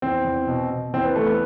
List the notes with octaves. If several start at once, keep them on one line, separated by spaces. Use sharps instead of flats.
E2 C4
E2
B2
B2
E2 C4
B3
E2 A3
B3